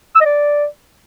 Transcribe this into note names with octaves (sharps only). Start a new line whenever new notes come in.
E6
D#5
D5